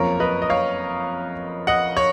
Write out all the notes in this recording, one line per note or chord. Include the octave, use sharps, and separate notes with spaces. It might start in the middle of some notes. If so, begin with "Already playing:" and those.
Already playing: F#1 F2 F3 A#3 C#4 A#4 C#5
B4 D#5
D#5
C#5 F5
D#5 F#5
C#5